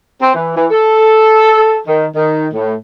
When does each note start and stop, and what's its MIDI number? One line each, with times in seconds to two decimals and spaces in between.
0.22 0.33 60
0.35 0.54 52
0.56 0.66 52
0.71 1.77 69
1.87 2.06 51
2.15 2.47 51
2.54 2.74 45